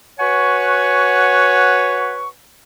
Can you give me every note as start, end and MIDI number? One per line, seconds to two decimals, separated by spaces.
0.19 2.28 66
0.19 2.28 71
0.19 2.28 73
0.19 2.28 78
0.19 2.28 80
0.19 2.28 85